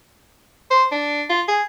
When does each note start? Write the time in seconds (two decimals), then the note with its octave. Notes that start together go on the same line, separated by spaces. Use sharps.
0.71 C5
0.92 D4
1.30 F4
1.48 G#4